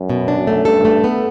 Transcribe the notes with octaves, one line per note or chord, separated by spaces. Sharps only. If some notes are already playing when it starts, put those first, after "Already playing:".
Already playing: F#2
B2
D4
A3
G2 A4
A3
B3